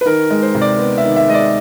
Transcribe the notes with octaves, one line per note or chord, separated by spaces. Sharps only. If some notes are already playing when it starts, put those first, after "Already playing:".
B4
D#3 A#4
G#3
C5
C3
D5
B3
E5
D#3
E5
G#3 D#5
D5